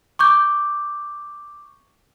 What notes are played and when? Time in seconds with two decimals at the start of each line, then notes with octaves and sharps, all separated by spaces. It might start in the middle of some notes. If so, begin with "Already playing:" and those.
0.19 C#6 D6 G6